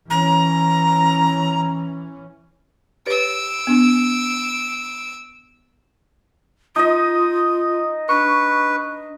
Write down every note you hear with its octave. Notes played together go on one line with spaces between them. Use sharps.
E3 C#4 A#5
G4 B4 C#5 E6 D7
B3 D4 G#5
D#4 F4 D#5 D#6
D4 B4 C#6